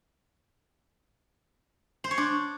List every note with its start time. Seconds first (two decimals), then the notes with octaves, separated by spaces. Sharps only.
2.04 C5
2.11 C#5
2.18 D4